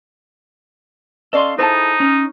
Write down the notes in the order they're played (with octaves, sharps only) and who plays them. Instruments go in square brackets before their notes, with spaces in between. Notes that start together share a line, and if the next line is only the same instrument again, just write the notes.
[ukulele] C#4 D5 D#5 [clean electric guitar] A4 F5 C6
[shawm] D#4 [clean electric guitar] E4 G#4 A4 [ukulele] C5 G#5 A5
[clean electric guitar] C#4